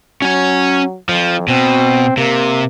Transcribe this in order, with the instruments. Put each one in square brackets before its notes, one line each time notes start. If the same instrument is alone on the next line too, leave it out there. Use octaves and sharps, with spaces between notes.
[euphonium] F#3 [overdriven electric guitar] C#4 G#5
[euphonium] F2 [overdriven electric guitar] F3
[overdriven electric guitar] B2 [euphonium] C4
[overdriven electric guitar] C3 [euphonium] A#3